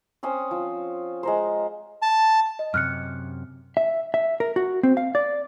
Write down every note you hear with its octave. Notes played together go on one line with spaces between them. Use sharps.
C4 C#4 C5 D#6
F3
G#3 A#4 C5
A5
D#5
F#2 C3 F6 F#6 C#7
E5
E5
A#4
F#4
C4
F5
D5